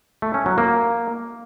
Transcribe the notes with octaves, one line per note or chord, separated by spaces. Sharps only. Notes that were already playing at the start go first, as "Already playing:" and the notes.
A3
C#4
F#3
A#3